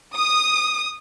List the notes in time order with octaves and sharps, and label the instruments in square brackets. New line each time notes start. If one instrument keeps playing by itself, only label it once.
[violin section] D#6